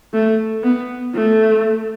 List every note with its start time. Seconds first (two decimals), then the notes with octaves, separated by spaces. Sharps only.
0.14 A3
0.63 B3
1.15 A3